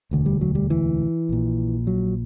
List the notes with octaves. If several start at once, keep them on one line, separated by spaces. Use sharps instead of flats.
E1 D2 D3
G3
F#3
G3
E3
A#1 A#2
F#3